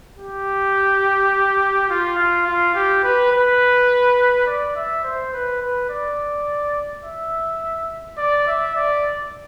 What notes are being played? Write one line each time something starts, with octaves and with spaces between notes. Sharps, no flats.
G4
F4
F4
F4
G4
B4
B4
D5
E5
C5
B4
B4
D5
E5
D5
E5
D5